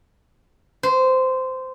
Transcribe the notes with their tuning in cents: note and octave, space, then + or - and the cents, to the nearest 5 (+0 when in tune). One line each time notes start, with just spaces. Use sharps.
C5 -15